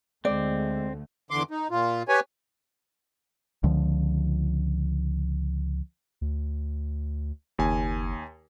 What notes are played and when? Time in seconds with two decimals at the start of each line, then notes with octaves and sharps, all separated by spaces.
0.25 D2 D3 G#3 A3 C4 D5
1.31 E2 D3 C6 D6
1.51 D#4
1.71 A#2 F4
2.08 G4 B4 C#5 G#5
3.64 C#2 D3 F3
6.21 D2
7.59 F#1 D#2 G#5